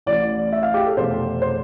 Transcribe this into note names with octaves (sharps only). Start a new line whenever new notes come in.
A1 A2 E3 D5
E5
F5
G4
A4
F1 E2 B2 A3 C5
C5